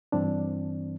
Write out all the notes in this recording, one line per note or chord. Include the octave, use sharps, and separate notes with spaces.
G2 E3 C4 D4